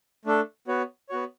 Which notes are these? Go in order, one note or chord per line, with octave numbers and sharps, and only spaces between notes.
A3 D4 A4
B3 F#4 C#5
B3 F#4 C#5